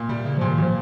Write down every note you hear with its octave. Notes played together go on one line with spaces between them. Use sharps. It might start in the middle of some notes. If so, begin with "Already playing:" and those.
Already playing: A#2 A#3
C3 G3
C#3 A#3
A#2 F3
D#3
A#2 F3